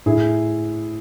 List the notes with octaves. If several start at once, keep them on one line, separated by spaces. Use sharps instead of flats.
A2 E4 G#4